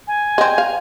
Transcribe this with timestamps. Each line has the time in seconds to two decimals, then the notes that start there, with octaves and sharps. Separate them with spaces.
0.07 G#5
0.38 G#3 C4
0.58 F5